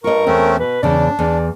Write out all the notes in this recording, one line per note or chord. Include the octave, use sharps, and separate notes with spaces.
G2 F4 A#4 D#5 C#6
E2 A3 C4 C#4
B2 B4
E2 C#3 D4 D5
E2 D5